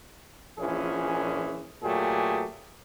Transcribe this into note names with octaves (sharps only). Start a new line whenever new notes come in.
A#1 A#2 E3 C#4 G#4
A#2 F#3 A3 G4 G#4